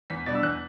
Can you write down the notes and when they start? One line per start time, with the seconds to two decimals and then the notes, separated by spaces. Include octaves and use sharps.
0.10 E2 B6
0.26 B2 G3 D4 A6
0.35 E6
0.43 E2 F#6